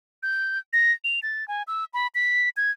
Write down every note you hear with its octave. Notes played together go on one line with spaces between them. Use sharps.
G6
A#6
F7
A6
G#5
E6
B5
B6
G#6